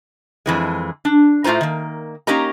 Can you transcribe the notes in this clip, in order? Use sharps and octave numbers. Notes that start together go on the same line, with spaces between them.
F2 E3 G#3
D4
A2 A3 F4 C5 A#5
D#3 A#3
A#3 C#4 D#4 G4 D#5 A#5